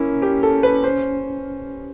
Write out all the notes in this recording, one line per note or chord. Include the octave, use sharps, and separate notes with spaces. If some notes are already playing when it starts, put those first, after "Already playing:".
Already playing: A#3 C#4 E4
G4
A4
B4
C5